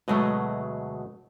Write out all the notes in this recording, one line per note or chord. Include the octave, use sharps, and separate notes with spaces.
D2 B2 F#3 G#3 A3 D#5